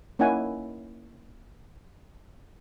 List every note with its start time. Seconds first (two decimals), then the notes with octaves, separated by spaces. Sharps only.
0.19 A#3 C#4 D#4 E4 F#5 G#5